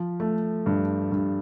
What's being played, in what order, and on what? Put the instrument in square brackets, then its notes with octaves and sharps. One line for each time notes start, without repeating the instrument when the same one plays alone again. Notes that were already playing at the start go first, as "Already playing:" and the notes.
Already playing: [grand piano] F3
A3
G2
G2